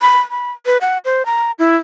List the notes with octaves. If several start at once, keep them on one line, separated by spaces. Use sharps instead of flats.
B5
B5
B4
F#5
C5
A#5
E4